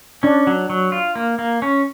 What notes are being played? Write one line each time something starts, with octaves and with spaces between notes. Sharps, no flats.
C#4 D4
F#3
F#3
F4
A#3
A#3
C#4